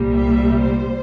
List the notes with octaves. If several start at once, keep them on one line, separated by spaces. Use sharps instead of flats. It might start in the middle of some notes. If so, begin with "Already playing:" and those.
Already playing: C2 A#2 G3
E5
C5